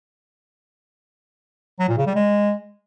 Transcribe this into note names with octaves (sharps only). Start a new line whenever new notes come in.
F#3
A#2
C#3
G3
G#3